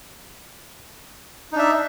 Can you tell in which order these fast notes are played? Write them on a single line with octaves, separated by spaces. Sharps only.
D#4 D4 E5